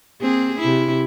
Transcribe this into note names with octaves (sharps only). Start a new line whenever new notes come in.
A#3 C4 G#4
C3 E4